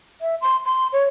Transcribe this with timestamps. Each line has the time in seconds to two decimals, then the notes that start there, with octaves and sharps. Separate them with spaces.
0.21 E5
0.41 C6
0.65 C6
0.93 C#5